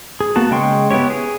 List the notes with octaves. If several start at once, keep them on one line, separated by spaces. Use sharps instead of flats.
G#4
A#3 B3 F#4 A5
C#3 G#3 G5 C6 C#6
B3 E4 G4 C#5
G#4